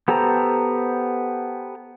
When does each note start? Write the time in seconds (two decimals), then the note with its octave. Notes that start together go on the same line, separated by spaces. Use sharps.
0.08 B3 G4 A4 C5 A#5